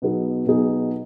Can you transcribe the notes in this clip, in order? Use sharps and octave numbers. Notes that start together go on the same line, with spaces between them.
B2 F#3 B3 D#4 G#4
B2 F#3 B3 D#4 G#4